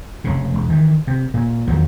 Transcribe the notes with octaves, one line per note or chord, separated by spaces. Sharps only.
F1 C#3
E1
D#3 E3
C3
A#2
E2 D#3 F3 F#3